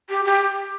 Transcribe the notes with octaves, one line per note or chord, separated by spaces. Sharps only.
G4
G4